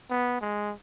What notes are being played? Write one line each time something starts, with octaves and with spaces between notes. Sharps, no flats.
B3
G#3